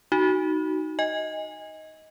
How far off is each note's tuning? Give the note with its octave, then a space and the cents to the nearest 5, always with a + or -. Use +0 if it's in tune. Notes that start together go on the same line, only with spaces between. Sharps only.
D#4 +0 F#4 +15
D#5 +15 G#5 -25